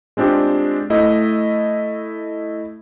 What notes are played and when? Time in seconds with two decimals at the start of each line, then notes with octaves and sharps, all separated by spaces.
0.17 G#3 C4 D4 F4 G4
0.90 A3 E4 D#5 E5